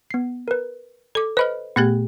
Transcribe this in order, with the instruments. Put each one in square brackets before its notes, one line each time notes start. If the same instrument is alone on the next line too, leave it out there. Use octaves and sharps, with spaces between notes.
[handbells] B3 C7
A#4 B4
[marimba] A4 D6
[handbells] B4 B5 [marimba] C5 D#5 F6
[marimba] A#2 A3 G4 [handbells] B3 F#6 G#6